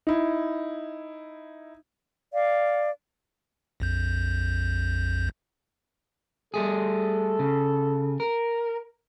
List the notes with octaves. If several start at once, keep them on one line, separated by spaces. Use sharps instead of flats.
D#4 E4
D5 F5
A#1 F2 G6
G3 A3 G#4 A4
C#3
A#4